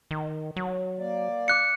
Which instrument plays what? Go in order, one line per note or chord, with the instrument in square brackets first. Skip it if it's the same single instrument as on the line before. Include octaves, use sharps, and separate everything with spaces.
[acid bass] D#3
F#3
[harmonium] A#3 D5
[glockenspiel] D6 F#6 C#7